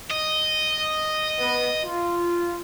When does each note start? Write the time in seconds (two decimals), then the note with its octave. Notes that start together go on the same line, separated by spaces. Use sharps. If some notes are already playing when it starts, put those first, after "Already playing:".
0.11 D#5
1.39 B3
1.85 F4